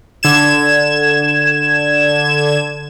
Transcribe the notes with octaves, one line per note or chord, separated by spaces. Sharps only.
D3 G#6 E7